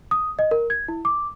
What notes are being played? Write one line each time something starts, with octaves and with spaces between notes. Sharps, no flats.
D#6
D#5
A#4
G#6
E4
D6